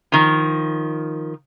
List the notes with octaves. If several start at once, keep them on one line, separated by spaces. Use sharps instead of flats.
D#3 F3